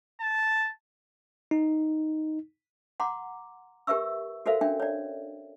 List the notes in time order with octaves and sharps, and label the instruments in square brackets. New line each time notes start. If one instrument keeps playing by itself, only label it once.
[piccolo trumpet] A5
[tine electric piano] D#4
[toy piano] F#5 A#5 C6 D6
G4 A#4 B4 E5 C#6 E6
F#4 A4 A#4 C5 E5 F5
C#4 D4 E5 G5
C#5 D5